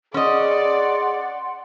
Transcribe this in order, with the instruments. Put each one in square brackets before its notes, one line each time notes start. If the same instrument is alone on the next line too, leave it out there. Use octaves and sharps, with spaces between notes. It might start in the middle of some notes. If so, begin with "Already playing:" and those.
[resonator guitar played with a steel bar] C#4 D#5 [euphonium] G#4 [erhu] D5 [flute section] F#5 C6